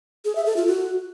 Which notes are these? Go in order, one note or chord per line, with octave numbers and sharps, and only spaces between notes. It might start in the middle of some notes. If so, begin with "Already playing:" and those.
G#4
E5
A4
F4
F#4